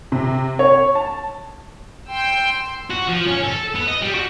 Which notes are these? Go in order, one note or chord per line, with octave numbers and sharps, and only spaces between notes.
C3
C#5
A5
G5 C6 E6
F#4
F3
C#4
A4
B3
D#5
G3
F#4